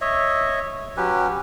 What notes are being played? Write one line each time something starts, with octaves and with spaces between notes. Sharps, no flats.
C#5 D#5 E5
F#3 C#4 G4 B4